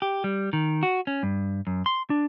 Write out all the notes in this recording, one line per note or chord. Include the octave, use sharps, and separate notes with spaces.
G4
G3
D#3
F#4
C#4
G2
F#2
C6
D4